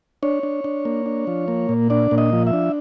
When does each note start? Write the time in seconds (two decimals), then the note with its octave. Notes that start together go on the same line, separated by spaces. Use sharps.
0.23 D4 C#5
0.43 D4
0.64 D4
0.85 A#3
1.06 D4
1.27 F3
1.48 A#3
1.69 A#2
1.90 D4 D5
2.11 A#2
2.18 D#5
2.33 F3
2.47 E5
2.53 D4